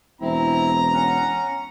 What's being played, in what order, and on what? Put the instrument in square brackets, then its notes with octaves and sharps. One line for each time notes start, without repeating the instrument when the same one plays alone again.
[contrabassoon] E1 [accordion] C4 E4 [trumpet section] A#5
[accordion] C#4 F#5